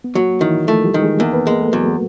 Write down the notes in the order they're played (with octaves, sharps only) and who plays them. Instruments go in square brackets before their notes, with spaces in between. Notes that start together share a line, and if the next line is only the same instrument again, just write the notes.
[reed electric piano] B3
[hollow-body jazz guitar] F#3 [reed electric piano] A#3
[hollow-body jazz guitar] D#3 [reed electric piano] E3 E4
[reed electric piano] F3 F4 [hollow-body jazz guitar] A3
[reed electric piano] G3 G4
[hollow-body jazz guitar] D#3
[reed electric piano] G#3 G#4
[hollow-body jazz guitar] E2 [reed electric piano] A#3 A#4
[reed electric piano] B3 B4
[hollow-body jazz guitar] G#3 [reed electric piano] A#3 A#4
[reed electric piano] A3 A4
[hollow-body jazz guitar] E2 [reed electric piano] F#3 F#4